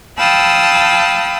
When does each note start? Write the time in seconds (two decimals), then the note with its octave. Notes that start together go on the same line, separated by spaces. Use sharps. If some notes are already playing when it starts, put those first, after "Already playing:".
0.18 F5 G5 A5 B5 D#6 E6